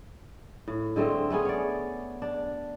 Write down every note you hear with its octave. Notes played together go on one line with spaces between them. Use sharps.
A2
D3 G#3 A3 C4
A3 B3 C#4 G#4
C#5 D5
D4